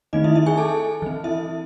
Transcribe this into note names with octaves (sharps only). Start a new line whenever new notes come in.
D#3 A3 C4 D#4 D#5
E4 E5
E4 E5
G#4 G#5
A4 A5
E3 C4
E4 E5